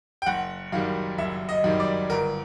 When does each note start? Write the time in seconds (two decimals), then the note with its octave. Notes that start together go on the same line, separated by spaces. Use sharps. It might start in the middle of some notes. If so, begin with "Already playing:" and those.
0.22 G5
0.26 F#1 F#5
0.72 F#2 D#3 G3 F5
1.18 F#1 E5
1.49 D#5
1.64 F#2 D#3 G3
1.80 D5
2.10 G1 A#4